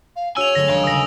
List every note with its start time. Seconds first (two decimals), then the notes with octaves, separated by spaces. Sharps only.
0.16 F5
0.37 D4 F#4 G#4 C#5 G#5 E6 F7
0.55 D3 F#3 A3 A#6 F7
0.69 D#1 G3 F5 G#5
0.84 C#3 B4 D#6 A#6